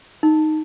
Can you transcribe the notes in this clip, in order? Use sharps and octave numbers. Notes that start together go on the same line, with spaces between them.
D#4